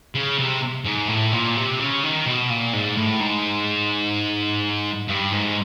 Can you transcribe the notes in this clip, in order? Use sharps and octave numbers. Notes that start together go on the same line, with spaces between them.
C#3
C3
G#2
A2
A#2
C3
C#3
D#3
B2
A#2
G#2
A2
G#2
G2
G#2